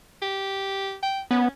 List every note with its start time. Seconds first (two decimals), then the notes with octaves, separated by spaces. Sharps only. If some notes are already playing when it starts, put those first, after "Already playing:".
0.22 G4
1.03 G5
1.31 B3 C#4